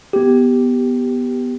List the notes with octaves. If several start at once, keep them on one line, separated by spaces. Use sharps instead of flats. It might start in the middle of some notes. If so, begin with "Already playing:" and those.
B3 G4